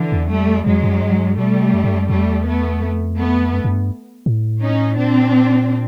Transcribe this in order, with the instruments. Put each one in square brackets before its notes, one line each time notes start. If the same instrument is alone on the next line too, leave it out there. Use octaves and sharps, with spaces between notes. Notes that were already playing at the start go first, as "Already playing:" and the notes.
Already playing: [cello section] D3 E3
[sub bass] E2
[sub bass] F2 [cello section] G3 A3
[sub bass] F2 [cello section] F#3 G#3
[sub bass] F#2
G2
[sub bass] B2 [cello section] G3 A3
[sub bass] C3
F#2
G2
F#2
[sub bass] F2 [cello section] G3 A3
[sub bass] E2
[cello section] A3 B3
[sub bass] F2
[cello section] A3 B3
[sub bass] F#2
F#2
G2
A2
[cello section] C#4 D#4
[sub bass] A#2 [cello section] C4 D4